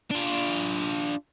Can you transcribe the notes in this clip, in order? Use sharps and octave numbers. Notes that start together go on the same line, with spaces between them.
D4 F4